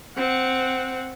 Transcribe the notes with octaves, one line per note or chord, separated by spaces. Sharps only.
C4 F#5